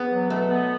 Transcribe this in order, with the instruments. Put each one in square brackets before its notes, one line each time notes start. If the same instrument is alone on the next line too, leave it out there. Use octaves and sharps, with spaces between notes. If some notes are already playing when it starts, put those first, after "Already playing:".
Already playing: [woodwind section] E2 [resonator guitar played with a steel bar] B3
[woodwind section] F#3
[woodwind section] B2 [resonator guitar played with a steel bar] A3
[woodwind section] B3